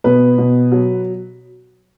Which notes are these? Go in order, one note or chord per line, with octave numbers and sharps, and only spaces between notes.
B2 B4
B2
F#3